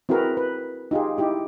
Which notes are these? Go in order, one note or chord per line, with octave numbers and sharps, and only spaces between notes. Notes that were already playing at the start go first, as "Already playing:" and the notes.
C4 E4 F#4 G#4 A#4 B4
B4
D#4 F4 G4 G#4
D#4 E4 G4 D#5